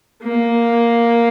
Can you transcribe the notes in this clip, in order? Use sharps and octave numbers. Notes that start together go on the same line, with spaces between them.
A#3